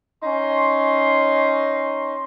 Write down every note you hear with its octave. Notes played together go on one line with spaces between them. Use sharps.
C#4 D#4 C6